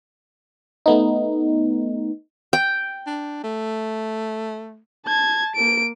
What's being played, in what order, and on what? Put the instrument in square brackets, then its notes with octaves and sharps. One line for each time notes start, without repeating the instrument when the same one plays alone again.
[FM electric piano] A3 B3 D#4
[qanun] G5
[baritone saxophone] D4
A3
[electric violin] A5 G#6
A#3 D7